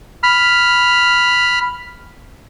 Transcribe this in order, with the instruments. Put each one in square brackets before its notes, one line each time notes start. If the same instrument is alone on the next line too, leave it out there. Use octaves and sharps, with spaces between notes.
[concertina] B5 F6